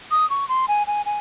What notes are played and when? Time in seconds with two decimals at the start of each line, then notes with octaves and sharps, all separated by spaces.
0.11 D#6
0.30 C#6
0.49 C6
0.68 G#5
0.87 G#5
1.06 G#5